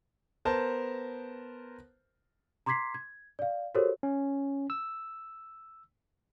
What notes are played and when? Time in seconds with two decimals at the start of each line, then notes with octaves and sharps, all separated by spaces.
0.45 B3 A#4 C5 A5
2.66 A#5 C6 D6 G#6 B6 C7
2.94 G#6
3.39 D5 F5
3.75 F#4 G4 A4 A#4 C5 C#5
4.03 C#4
4.70 E6